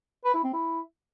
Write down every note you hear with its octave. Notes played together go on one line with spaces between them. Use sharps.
B4
E4
C4
E4